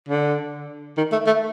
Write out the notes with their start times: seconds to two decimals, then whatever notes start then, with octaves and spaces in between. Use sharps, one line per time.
0.09 D3
0.97 D#3
1.12 A3
1.27 A3